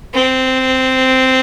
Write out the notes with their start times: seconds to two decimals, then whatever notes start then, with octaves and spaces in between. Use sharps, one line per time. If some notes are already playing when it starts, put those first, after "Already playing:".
0.14 C4